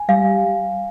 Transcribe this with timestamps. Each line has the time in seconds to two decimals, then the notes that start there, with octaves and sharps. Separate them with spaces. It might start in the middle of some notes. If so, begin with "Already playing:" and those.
Already playing: G#5
0.09 G3 F5